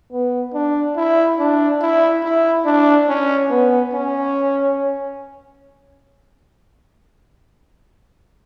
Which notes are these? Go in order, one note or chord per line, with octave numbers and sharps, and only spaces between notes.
B3
D4
E4
D4
E4
E4
D4
C#4
B3
C#4